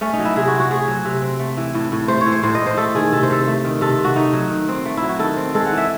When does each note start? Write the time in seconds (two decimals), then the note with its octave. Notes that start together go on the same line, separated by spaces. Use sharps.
0.01 A3 C#4
0.13 D#4
0.19 F#3
0.25 E4
0.36 C3 G#4
0.48 F#4
0.53 C4
0.60 F#4
0.71 A3 G#4
0.88 F#3
1.05 C3
1.22 C4
1.40 A3
1.57 E3
1.74 A2
1.92 A2
2.08 A3 C5
2.21 C#5
2.26 E3
2.32 C5
2.43 A2 C5
2.55 D#5
2.60 A2
2.66 C5
2.77 A3 A4
2.95 D#3 G#4
3.13 C3 A4
3.23 C5
3.30 C3 A4
3.47 A3
3.64 D#3
3.81 C3 A4
3.98 C3
4.04 F#4
4.16 A3 D#4
4.33 F#3
4.50 D#3
4.69 C4
4.85 A3
4.97 E4
5.02 F#3
5.09 F#4
5.19 D#3 A4
5.36 C4
5.54 G#3 A4
5.66 F#5
5.72 E3
5.78 E5